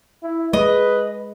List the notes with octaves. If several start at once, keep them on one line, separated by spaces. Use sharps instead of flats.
E4
G#3 B4 D#5